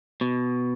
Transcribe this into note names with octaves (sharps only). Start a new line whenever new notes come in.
B2